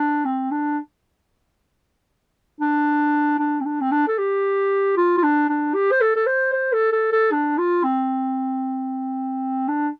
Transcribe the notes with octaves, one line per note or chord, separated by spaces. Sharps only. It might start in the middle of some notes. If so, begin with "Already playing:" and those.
Already playing: D4
C4
D4
D4
D4
C4
D4
C4
D4
A4
G4
F4
F4
D4
D4
G4
C5
A4
A4
C5
C5
A4
A4
A4
D4
F4
C4
D4